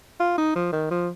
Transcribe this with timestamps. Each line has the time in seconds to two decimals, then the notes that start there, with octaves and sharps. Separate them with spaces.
0.20 F4
0.38 D#4
0.56 F3
0.72 D#3
0.91 F3